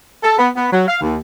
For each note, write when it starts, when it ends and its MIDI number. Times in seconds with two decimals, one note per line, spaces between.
0.24 0.36 69
0.38 0.49 59
0.56 0.68 59
0.73 0.88 54
0.88 0.97 77
1.01 1.17 39